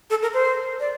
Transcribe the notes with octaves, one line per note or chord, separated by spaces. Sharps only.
A4
A#4
C5
D5